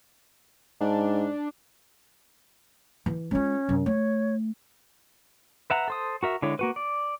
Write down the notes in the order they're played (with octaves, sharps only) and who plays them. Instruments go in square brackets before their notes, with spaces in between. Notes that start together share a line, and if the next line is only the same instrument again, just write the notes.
[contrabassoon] G#2 [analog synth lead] D4
[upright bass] E3
[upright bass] G#3 F4 [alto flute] C#4
[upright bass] F#2 C3
[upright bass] A3 [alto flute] C#5
[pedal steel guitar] B4 E5 F#5 A#5
A4 C5 D#6
F#4 A#4 E5
D3 G#3 E4 C#5
A#3 F#4 B4
D5